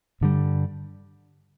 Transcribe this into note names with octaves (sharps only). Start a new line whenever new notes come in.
G2 D3 G3